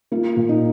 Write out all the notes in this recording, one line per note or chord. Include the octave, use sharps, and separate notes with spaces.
A#3 F4
A#2
D#4